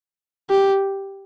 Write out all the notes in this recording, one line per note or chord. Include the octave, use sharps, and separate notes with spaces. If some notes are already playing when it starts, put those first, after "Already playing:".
G4